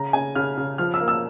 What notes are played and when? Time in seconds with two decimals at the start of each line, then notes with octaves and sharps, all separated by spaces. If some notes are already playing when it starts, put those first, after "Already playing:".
Already playing: C#3 A#5
0.13 C#3 G#5
0.36 C#3 F6
0.58 C#3
0.78 F3 F6
0.94 E6
1.00 A#3
1.08 E6